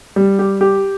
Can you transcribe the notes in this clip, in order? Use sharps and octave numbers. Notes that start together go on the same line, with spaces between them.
G3
G4
G4